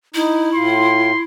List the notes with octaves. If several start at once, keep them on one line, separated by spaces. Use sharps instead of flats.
D#4 E4
A2 F4 C6